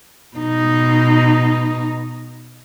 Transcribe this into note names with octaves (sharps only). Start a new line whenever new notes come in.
B2 D#4